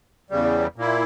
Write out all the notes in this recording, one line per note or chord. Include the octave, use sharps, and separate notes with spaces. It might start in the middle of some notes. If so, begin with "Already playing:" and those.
E2 C#3 G3
A#2 A#3 E4